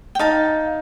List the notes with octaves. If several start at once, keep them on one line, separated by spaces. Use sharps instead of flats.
G5
D#4 F5 A5